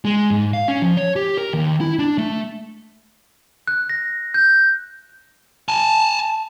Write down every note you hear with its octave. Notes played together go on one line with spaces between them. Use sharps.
G#3
G#2
F5
C#4
F3
C#5
G4
A#4
D#2
E4
D4
A3
F#6
A#6
G6
G#5 A5